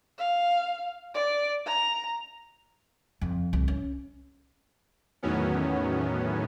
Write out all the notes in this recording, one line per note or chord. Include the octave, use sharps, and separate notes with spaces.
F5
D5
A#5
F2
C2
C#4
E2 A2 D#3 F#3 B3 C#4